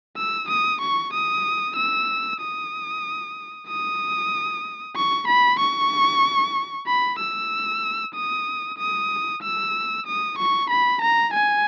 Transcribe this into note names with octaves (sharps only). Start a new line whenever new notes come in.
E6
D#6
C#6
D#6
E6
D#6
D#6
C#6
B5
C#6
B5
E6
D#6
D#6
E6
D#6
C#6
B5
A#5
G#5